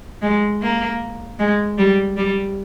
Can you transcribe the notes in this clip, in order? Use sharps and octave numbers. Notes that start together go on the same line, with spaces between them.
G#3
A#3
G#3
G3
G3